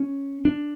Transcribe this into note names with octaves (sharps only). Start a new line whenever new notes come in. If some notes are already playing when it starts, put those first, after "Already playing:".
Already playing: C#4
D4